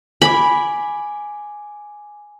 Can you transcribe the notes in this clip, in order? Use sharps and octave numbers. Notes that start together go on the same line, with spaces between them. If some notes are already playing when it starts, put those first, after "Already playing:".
G#5 B5 D6